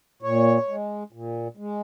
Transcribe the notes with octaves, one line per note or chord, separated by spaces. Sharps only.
A#2 C#5
G#3
A#2
G#3